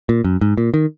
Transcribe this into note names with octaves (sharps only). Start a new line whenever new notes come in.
A#2
F#2
G#2
A#2
D#3